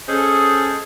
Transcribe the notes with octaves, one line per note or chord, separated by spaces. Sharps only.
C#4 G#4 A4 C5 D#5